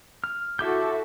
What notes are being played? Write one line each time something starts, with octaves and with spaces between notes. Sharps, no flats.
F6
E4 F#4 A4 E5 D6 G6